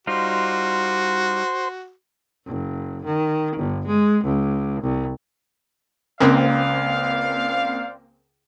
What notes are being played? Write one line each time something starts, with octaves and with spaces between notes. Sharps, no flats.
G3 D#4 F4 F#4 C5
F#1
D#3
G1
G#3
C#2
C2
C#2 A#3 C4 C5 D5 F5